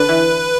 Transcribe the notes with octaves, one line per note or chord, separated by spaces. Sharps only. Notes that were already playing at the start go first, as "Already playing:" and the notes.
Already playing: D3 D4 B4
E3 E4